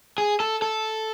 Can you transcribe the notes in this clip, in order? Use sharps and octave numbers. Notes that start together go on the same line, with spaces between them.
G#4
A4
A4